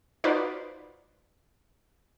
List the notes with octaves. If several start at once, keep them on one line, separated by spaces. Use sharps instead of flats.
D#4 F4 F#4 B4 C5 D5